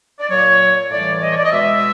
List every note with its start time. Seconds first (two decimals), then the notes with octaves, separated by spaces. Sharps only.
0.20 D5
0.29 A#2 F#3 C#5
0.90 A2 E3 G3 D5
1.17 D5
1.21 D#5
1.30 C#5
1.37 D5
1.44 D#5
1.51 B2 G#3 E5